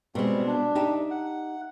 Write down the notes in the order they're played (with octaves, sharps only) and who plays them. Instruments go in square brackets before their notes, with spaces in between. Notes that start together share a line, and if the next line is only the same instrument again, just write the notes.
[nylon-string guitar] B2 G#3 [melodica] G3 C4
[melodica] D4
[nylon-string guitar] D#4 G4 E5
[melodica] F#5